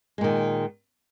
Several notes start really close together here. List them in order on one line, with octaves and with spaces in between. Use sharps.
G#3 A#2 D#3